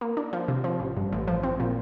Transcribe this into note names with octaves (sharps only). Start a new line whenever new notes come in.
A#3
D4
F3
C3
F3
A1
G2
A1
F3
C4
A#2